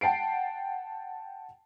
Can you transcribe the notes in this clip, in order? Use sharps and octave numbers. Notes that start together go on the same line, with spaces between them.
F#5 G5 A5 C7 D7